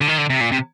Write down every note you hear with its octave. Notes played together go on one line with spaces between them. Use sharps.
D3
D#3
D3
C3
A#2
C3